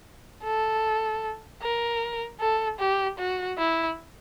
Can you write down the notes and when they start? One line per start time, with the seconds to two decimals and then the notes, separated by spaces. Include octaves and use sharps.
0.44 A4
1.62 A#4
2.40 A4
2.79 G4
3.18 F#4
3.58 E4